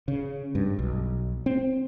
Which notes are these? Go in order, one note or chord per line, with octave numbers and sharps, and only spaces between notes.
C#3
G2
B1
C4